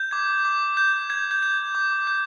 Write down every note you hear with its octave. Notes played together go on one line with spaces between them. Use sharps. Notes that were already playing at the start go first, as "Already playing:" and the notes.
Already playing: G6
D6 G#6
D6
G6
G6 G#6
G6
G6 G#6
D6
G6